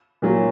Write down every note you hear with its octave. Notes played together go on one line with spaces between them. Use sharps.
A#2 F#3